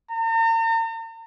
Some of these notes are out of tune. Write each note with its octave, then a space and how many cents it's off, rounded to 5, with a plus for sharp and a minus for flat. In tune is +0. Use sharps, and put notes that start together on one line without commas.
A#5 -45